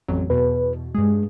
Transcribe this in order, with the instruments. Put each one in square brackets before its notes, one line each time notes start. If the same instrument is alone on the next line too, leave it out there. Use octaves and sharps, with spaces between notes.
[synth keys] A1 F2 F#3
[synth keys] E2 B2 [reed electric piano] B4
[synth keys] G2 G#4 [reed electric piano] G#3